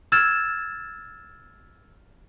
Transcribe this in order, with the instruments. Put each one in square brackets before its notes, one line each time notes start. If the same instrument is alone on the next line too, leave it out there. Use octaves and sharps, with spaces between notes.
[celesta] E6 F6 G#6 A6 E7